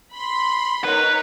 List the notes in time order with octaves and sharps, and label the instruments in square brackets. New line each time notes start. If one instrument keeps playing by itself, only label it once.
[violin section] B5 C6
[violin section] D#4 A#4 C#5 [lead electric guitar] B4